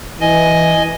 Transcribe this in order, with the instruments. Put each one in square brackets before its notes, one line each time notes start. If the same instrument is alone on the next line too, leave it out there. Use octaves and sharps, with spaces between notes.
[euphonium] E3 [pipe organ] D#5 G#5